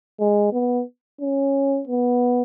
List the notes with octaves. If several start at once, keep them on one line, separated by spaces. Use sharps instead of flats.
G#3
B3
C#4
B3